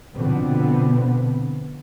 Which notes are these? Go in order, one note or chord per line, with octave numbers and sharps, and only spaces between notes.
B2 D3 F3 B3 C4